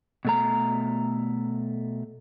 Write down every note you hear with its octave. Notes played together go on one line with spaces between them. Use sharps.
B2 A3 A#5